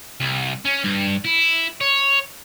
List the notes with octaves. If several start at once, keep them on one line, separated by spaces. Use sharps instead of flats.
C2
C#4
G2
E4
C#5